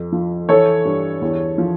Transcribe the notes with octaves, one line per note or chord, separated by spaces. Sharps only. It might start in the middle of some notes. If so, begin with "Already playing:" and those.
Already playing: F2
F3
E3 A4 C#5
G2
E2
F3